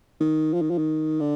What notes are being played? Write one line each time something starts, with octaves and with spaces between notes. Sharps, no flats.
D#3
F3
D#3
F3
D#3
D3